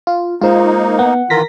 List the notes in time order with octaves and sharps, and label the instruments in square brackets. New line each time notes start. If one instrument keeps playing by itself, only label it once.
[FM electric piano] F4
[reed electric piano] G#3 C5 [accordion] A#3 D#4 [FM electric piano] F4
[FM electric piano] B3 [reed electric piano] F#5
[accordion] D#3 E3 F4 [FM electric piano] A#4 A#6 B6